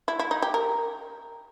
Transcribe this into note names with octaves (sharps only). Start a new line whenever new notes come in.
E4
E4
D#4
G4
A#4